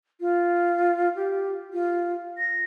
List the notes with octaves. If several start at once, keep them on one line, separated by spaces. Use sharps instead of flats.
F4
G4
F4
A#6